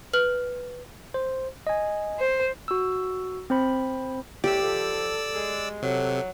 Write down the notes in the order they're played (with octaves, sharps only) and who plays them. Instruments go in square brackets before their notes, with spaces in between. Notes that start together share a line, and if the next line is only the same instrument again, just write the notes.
[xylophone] B4 F6 F#7
[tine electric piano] C5
D#5 G#5
[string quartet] C5
[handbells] F#4 E6
C4 C5 B5
[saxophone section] E2 A2 [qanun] G4 [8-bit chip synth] D5 E6
[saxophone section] F3 [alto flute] A4
[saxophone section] G#3
[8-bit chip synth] C3 [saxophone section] F#3 [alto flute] A4